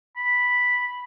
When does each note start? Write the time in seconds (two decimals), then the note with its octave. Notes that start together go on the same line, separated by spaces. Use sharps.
0.16 B5